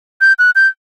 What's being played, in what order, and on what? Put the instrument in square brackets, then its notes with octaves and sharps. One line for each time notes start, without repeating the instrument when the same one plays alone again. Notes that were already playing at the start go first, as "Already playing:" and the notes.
[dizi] G6
F#6
G6